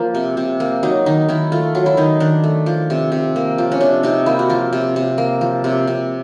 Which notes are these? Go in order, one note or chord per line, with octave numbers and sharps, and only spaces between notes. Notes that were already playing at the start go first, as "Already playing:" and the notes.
Already playing: F3 A#3
C3
C3
A#3
F#3 D#4
D#3 D#4
D#3 E4
A3 F4
F#3 F4
E4
D#3 D#4
D#3 D4
A3
F3
C3
C3
A#3
F3
C#4
C3 D4
C3 D#4
A#3 E4
F#4
F3 F4
C3
C3
A#3
F3
C3
C3